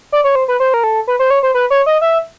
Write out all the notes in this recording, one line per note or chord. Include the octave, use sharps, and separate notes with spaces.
D5
C#5
C5
B4
C5
A#4
A4
B4
C5
C#5
C5
B4
C#5
D#5
E5